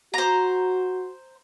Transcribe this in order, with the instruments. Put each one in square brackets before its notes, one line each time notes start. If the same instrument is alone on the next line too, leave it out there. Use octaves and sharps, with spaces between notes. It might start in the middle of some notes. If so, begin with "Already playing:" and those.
[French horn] F#4 [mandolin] C5 A#5